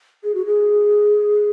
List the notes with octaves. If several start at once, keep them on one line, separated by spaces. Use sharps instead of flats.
G#4
F#4
G#4